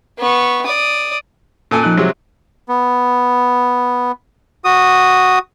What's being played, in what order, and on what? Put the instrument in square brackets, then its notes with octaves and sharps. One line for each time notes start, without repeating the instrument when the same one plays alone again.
[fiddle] B3 C#6
D5 D#6
[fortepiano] A#2 A4 G#5
[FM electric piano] F3 D#4 F#6
[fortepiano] C3 F#3 G#3
[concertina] B3
F#4 D#6